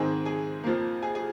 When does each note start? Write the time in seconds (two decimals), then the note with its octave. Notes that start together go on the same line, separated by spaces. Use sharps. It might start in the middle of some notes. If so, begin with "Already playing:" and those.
Already playing: G#2 D#3 G#3 C4 G#4 G#5
0.25 G#4 G#5
0.64 F2 F3 A#3
1.02 G#4 G#5
1.15 G#4 G#5